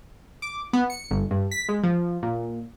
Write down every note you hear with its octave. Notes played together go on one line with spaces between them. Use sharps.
D6
B3
C#7
G1
G2
B6
G#3
F3
A#2